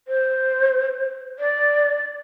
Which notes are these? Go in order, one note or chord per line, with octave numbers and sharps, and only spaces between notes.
C5
D5